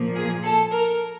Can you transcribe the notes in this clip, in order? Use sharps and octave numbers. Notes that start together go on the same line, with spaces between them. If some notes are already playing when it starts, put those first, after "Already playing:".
Already playing: A#2 F3 A#3
G#4
A4
A#4